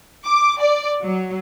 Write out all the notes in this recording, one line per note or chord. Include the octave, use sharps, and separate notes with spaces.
D6
D5
F#3